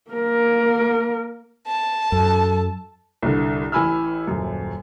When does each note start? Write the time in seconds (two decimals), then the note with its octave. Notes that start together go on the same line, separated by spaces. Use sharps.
0.11 A#3 A#4
1.67 A5
2.12 F#2 A4
3.22 C2 G2 D3
3.72 A1 E3 G#5 B5 E6 F6
4.27 D#1 F#2